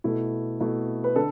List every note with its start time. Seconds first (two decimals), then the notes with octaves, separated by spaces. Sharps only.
0.04 B2 A3 E4
0.60 B2 A3 E4
1.04 B4
1.16 D3 A4